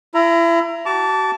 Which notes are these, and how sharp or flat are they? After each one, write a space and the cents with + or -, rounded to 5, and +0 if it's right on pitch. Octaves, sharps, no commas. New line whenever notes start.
E4 +35 A#5 +0
F#4 +35 A5 +0 D6 -30